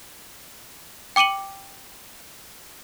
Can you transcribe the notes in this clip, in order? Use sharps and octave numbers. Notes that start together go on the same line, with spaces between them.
G5 D6 C#7 D#7 F#7